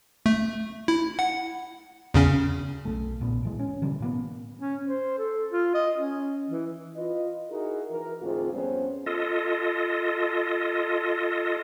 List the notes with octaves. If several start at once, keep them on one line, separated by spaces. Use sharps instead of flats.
A3
E4
F#5
E2 C#3 C#4
B1 E2 A3
D#1 A#1 A#2 B3
A2 E3 G#3
C#4
B2 D3 E3 G3
A2 A#3 B3
C#4
C5
A4
F4
D#5
C#4
E3
F4 B4 D#5
D#4 E4 F#4 G#4 A#4
E3 A#4
D2 G#2 C4 F4 G#4
F2 G3 B3 C#4 C5
F4 A4 D#5